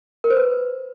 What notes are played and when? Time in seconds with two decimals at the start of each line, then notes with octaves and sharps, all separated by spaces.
0.24 A#4
0.30 C5
0.37 B4